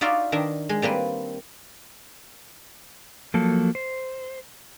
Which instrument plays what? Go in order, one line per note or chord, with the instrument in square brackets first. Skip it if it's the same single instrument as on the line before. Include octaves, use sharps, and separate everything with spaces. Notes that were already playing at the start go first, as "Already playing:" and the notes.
[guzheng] D#4 F4 F#4 D5 E5 F5
D#3 D4 E5 A#5
G#3
G3 A#3 C4 B4
[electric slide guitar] F3 F#3 A#3 A4
C5